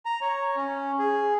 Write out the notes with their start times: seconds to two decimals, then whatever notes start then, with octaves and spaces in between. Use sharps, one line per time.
0.06 A#5
0.21 C#5
0.56 C#4
0.99 G#4